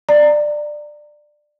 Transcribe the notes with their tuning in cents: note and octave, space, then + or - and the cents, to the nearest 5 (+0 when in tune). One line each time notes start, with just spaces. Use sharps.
D5 +15 A#5 -25